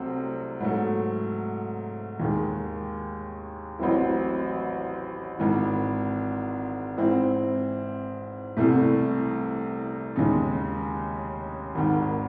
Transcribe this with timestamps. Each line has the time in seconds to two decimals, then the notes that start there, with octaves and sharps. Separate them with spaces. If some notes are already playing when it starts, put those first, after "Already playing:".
Already playing: C2 C3 F#3 A3 C4
0.60 G#2 F#3 A3
2.20 D#2 D#3 G#3
3.79 A1 A2 F#3 C4 E4
5.38 G#1 G#2 E3
6.97 G#2 E3 C4 E4
8.57 C2 C3 E3 A3
10.16 D#2 C#3 G#3 D#4
11.75 G#1 G#2 D#3